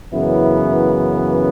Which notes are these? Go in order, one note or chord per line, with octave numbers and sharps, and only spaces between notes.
F#2 C#3 E3 B3 E4